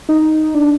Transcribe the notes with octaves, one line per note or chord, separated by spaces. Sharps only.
D#4
D4